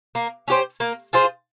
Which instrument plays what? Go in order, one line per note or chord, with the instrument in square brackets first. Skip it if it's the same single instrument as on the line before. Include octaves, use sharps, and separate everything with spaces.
[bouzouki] A#3
C#4 G4 C5
A#3
F4 G#4 C5